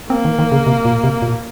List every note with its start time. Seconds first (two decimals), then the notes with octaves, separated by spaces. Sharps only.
0.10 A#3 C4
0.25 D#3
0.39 D#3
0.52 C#3
0.67 C3
0.85 A#2
1.04 C3
1.22 A#2